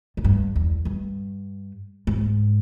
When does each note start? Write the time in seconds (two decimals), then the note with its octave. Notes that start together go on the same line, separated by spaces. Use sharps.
0.17 G#2
0.24 G2
0.56 E2
0.85 G2
2.07 G#2